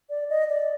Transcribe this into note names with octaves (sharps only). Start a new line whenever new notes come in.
D5
D#5
D5